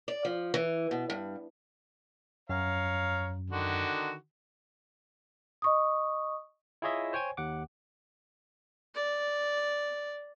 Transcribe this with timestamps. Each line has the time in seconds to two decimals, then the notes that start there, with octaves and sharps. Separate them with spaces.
0.08 D5
0.25 F3
0.54 E3
0.91 B2
1.10 G2
2.49 F#2 C#5 F5 A#5
3.50 D3 D#3 F#4
5.62 D#5 C#6 D#6
6.82 E4 F4 G#4 C#5 D#5 E5
7.13 C5 C#5 G5 G#5 G#6
7.37 D#2 F#5 D6
8.95 D5